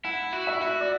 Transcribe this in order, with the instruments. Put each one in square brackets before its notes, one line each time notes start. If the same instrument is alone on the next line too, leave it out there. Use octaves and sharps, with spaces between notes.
[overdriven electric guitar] E4 [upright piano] F#5
[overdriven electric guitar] F#4
[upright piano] E5
[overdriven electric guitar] E4
F#4
[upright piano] D5